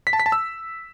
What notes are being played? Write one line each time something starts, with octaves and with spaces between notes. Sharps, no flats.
B6
A5
B6
A5
E6